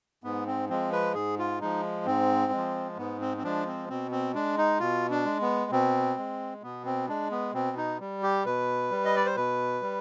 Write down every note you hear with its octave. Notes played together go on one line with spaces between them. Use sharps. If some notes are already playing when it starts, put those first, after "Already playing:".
G#2 B3
C4
F3 G#3 C4
B4
G#2 G#4
F4
F3 G#3 D#4
G#2 C4
F3 G#3
G#2 B3
C4
C4
F3 G#3 D4
C4
B2 C4
C4
G#3 D4
D#4
B2 F4
D4
G#3
B3
B2 C4
G#3
B2 B3
C4
G#3 D4
B3
B2 C4
D#4
G3
G4
B2 B4
G3
D#5
D5
C5
B2 B4
G3